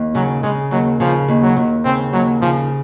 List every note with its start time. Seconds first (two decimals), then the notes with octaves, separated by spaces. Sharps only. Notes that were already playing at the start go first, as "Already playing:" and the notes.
Already playing: D#2
0.15 C#3 F#3
0.43 C#3 G#3
0.71 D#2 F#3
1.00 C#3 F3
1.28 D#2
1.42 F#3
1.57 D#2
1.85 C#3 C4
2.13 D#2 F#3
2.41 C#3 F3